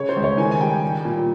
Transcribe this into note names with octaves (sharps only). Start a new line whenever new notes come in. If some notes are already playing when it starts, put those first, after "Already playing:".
Already playing: C#3 C#5
C5
C#2
C#5
D#3 G#5
G#5
G3 G5
G3
A#2